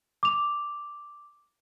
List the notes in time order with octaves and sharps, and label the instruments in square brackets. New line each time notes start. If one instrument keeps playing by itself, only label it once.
[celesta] D6 F7